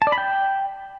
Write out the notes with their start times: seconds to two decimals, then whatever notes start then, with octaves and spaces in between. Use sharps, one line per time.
0.02 A5
0.07 D5
0.12 B5
0.18 G5